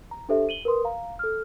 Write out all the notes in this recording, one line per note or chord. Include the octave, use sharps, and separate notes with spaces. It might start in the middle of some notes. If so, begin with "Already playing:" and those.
A#5
D4 G4 A4 C5 E5
D#7 F#7 G7
A#4 B4 C6 D#6
F5 A#5
A4 F6